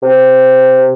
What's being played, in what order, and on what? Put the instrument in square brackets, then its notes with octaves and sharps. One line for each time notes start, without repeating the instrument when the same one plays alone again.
[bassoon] C3